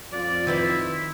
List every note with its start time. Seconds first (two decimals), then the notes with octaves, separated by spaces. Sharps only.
0.12 F2 F4 D5
0.47 D#3 E4 B4 C5